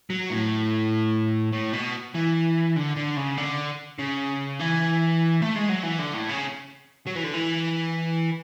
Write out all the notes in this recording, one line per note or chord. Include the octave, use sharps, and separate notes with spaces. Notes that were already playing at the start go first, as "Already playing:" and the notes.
F#3
A2
A2
B2
E3
D3
D3
C#3
D3
C#3
E3
A3
G#3
F#3
E3
D3
A2
C#3
F#3
E3
D3
E3